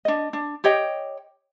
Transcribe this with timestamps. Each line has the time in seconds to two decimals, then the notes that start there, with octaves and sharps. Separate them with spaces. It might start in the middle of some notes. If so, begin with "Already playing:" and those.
0.05 D4 D#5
0.33 D4
0.64 G4 C#5 D#5 G5